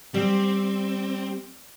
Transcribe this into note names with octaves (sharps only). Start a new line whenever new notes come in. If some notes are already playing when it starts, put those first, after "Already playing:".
G3 C4